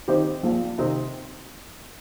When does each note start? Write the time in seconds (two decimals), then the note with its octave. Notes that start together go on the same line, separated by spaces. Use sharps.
0.08 D#3 C4 D#4 G4 C5
0.43 A#1 A#2 F3
0.78 C3 D#3 C4 D#4